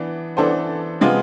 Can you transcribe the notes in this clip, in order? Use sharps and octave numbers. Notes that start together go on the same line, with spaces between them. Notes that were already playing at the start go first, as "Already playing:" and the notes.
Already playing: E3 B3 D4
E3 B3 D4 A4 C5
C3 G#3 B3 F4